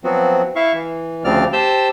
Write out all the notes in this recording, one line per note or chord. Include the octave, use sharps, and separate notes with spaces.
F3 F#3 B3 C4 F#4
E4 E5 F5 C#6
E3
D2 C#3 F3 C4 D5 F6
G4 C5 A5 E6 G6